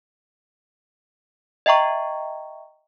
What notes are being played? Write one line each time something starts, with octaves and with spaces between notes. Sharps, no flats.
D#5 E5 G5 A#5 C#6